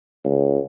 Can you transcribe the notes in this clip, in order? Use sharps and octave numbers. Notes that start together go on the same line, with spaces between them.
C#2